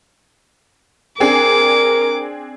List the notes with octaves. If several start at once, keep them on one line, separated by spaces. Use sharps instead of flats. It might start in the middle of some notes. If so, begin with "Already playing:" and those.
C4 D4 G#4 A#4 D6